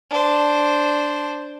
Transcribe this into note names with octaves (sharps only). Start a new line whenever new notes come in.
D4 C5